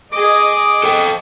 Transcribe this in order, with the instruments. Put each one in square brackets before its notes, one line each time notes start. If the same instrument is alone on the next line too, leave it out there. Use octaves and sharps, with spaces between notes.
[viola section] G#4 D#5 [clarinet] D6
[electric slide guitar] A4 C5 G5